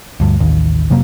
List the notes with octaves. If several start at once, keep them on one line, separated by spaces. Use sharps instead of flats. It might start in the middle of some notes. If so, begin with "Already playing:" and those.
D2 G2
A1 D#2
F1 C3 F#3 A#3